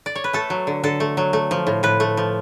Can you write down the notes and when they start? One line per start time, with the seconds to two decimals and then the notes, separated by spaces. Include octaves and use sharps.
0.06 D5
0.15 C#5
0.24 B4
0.33 A3 A4
0.50 F#3
0.67 D3
0.83 D3 A4
1.00 A3
1.17 F#3
1.33 A3
1.51 F3
1.67 A2
1.83 A2 B4
2.00 A3
2.17 F3